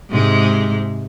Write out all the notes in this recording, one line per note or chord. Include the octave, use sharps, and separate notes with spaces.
G#2 C3 G#3